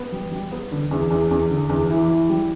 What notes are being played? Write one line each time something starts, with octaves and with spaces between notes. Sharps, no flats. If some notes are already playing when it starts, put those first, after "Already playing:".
Already playing: B3
G3
G3
B3
D3
E2
E2
E2
D3
E2
E3
E3
G3